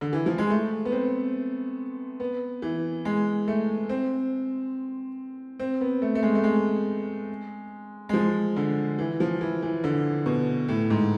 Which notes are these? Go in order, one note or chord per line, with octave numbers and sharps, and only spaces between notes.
D3
E3
F3
G#3
A3
B3
C4
B3
E3
G#3
A3
C4
C4
B3
A3
A3
G#3
A3
G#3
G#3
F3
D3
E3
F3
E3
E3
D3
B2
A2
G#2